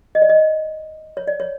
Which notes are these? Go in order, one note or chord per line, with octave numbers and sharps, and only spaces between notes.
D#5
D5
D#5
C#5
D5
C#5